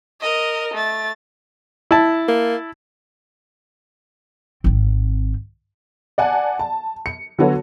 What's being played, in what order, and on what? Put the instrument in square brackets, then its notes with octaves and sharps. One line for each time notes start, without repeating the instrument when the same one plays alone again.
[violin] A#4 D#5
A3 A6
[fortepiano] E4 A5
[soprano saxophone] A#3
[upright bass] G#1 C4
[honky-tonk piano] D5 F#5 G#5 A5
A5
C#7
D3 F#3 B3 F#4 A4 C#5